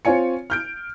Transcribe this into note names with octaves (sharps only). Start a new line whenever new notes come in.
C4 F4 C#5 G#5 C#7
F6 G6 D7